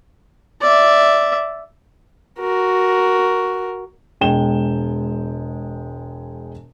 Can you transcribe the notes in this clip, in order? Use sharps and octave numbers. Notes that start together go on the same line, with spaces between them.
D5 E5
F#4 A#4
E1 G#3 G5 E7 G7